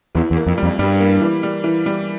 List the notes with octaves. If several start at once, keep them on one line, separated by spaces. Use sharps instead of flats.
E2 E3
E2
A#3
F2
G3
F2
G2 G3
A#3
E3
G3
E3
G3